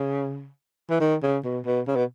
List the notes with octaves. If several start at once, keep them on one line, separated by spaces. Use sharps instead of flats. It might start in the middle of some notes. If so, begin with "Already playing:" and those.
Already playing: C#3
E3
D#3
C#3
B2
B2
C#3
B2